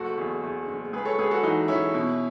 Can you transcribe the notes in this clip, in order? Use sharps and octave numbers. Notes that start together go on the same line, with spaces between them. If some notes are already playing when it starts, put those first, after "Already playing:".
Already playing: F#1 F#4 A4
E2
E2
F#1
C#2 G#4 B4
A4 C#5
C#2 G#4 B4
F#4 A4
E3 D#4 F#4
E3 C#4 E4
B2